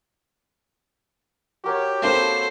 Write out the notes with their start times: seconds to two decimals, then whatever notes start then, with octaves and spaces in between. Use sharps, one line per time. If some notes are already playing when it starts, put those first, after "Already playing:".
1.64 F#4 G4 A#4 C#5
2.02 A#3 C4 A4 C5 A5 B5